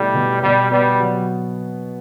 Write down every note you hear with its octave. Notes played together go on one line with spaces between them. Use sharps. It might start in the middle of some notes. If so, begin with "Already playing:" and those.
Already playing: B2 G3 A3 E4
B2
B2 G3
G3 B3
F#3